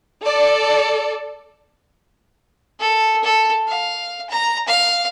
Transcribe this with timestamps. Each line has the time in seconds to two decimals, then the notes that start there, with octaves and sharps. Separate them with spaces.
0.23 A4 D5
2.80 A4
3.23 A4
3.68 F5
4.29 A#5
4.67 F5